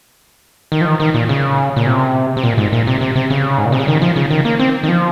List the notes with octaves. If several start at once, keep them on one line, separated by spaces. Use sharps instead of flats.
D#3
F3
D#3
D#3
A#2
C#3
A#2
C3
C3
A#2
G#2
A#2
C3
C3
C3
C#3
G#2
A#2
C3
C#3
D#3
F3
C#3
D#3
A#3
C4
D#3
F3